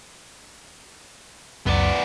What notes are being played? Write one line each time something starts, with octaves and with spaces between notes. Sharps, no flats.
C#2 F#2 B3 D5